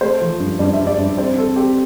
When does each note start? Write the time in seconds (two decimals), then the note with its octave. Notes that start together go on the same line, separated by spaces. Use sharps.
0.01 A3 C5
0.21 F3
0.40 G2
0.59 G2 D5
0.73 E5
0.79 G2
0.87 D5
0.98 G2
1.17 C4 C5
1.37 C4 A4
1.56 C4 G4